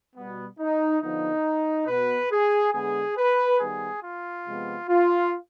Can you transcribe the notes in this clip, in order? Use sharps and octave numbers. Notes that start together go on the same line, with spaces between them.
B2 G3 B3
D#4
D3 F3 B3 D#4
B2 B3 B4
G#4
D3 G#3 B3 G#4
B4
D#3 G3 B3 G#4
F4
C3 F3 G#3 B3
F4